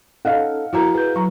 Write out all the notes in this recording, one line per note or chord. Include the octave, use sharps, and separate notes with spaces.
C#4 D#4 A4 D#5 F5 F#5
F3 E4 F#4 A#4 A#5
G#4 B4 G6
F#3 A#5 C#6